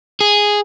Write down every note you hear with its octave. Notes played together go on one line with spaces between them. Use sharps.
G#4